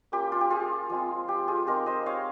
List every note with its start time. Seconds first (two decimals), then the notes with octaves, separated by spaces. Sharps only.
0.12 A#3 C#4 F4 G4
0.32 F4
0.41 G4
0.50 F4 G#4
0.90 F3 G#3 C4 F4
1.28 G4
1.48 F4 G#4
1.67 G#3 C4 D#4 G4 A#4
1.86 C5 D#5
2.06 C#5 F5